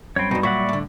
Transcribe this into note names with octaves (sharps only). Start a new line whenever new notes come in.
F#2 G3 C4 C#5 G5 B5
G2 B2 D#4
A#2 F#3 F#4 D5 E5 F#5 C#6
A2 D3